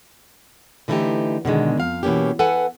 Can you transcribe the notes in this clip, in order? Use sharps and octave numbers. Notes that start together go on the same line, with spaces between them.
D3 E3 A3 B3 D#4 G4
B2 D3 D#3 G#3
F2 F5
B2 E3 A#3 C#4 G4
A4 B4 F#5 G#5